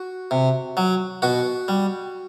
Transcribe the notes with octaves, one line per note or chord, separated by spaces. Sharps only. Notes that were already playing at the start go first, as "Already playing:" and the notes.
Already playing: F#4
C3
F#3
B2 F#4
G3